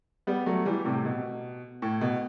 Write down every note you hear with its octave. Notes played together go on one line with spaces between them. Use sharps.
G3 B3
F#3 A3
E3 G3
A2 C3
B2
A2
B2